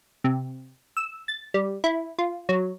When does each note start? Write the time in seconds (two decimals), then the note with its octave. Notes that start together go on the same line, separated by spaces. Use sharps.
0.24 C3
0.97 E6
1.28 A6
1.54 G3
1.84 E4
2.19 F4
2.49 F#3